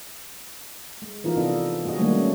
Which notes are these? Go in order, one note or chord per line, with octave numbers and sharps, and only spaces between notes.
G#3
E3 F3 D#4 F4 A#4
C3 B3 D4 D#4 A4 D#5
G#3 B3 F#4 G#4 D#5
D#3 F#3 G3 A3 A#3 D4
C#4